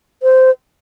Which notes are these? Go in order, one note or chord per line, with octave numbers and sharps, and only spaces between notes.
C5